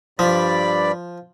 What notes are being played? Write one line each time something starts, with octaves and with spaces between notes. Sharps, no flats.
G2 F3 D5 B5